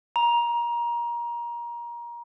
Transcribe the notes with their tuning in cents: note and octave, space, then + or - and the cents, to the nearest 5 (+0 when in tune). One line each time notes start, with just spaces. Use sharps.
A#5 +25